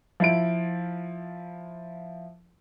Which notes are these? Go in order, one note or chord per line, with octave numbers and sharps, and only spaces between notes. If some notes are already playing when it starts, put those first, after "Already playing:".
F3 E4 D7